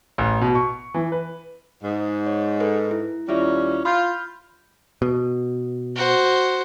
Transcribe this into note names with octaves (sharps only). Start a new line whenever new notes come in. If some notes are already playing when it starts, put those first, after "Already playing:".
A1
B2
C#6
E3
B4
G#2
C#5
A4 B4
E4
D#2 G3 C#4 E4 F4 E5
F4 B5 F6 G6
B2
F#4 C5